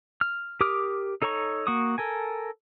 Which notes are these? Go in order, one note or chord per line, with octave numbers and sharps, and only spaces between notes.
F6
G4 A#4 D6 D#6 F6
D#4 A4 C#5 A#5 C#6
A#3 F#4 C#6 D#6
A4 A#4 G#5